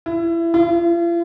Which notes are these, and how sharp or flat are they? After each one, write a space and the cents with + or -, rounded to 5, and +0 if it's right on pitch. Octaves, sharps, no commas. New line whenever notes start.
E4 +25
F4 -45